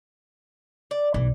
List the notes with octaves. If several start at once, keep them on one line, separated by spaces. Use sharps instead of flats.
D5
B1 E3